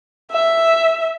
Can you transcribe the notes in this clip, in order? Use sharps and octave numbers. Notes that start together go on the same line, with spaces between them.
E5